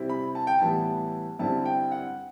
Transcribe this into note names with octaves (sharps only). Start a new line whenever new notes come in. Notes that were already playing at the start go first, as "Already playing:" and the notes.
Already playing: C3 G3 C4 E4
B5
A5
G5
A2 E3 G3 B3 E4 A5
G2 D3 G3 C4 E4 A5
G5
F#5